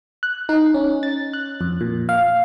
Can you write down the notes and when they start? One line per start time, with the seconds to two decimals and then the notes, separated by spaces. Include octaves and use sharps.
0.23 F#6
0.49 D#4
0.74 C#4
1.03 A6
1.33 F#6
1.61 F2
1.81 A#2
2.09 F5